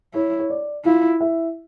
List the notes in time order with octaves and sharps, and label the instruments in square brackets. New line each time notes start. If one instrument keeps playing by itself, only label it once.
[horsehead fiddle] E4 [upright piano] C#5
[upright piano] C#5
D5
[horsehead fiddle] E4 [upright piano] F4 F5
[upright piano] E4 E5